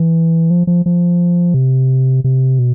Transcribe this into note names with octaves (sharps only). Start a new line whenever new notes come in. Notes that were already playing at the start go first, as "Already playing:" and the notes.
Already playing: E3
F3
F3
F3
C3
C3
B2